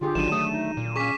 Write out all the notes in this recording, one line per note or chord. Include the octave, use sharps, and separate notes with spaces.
D3 F4 G4 G#4
G#1 D#3 F#3 D4 D#7 E7
A3 D#6
D#4
A#2
C#4 G#4 C#6 D6 B6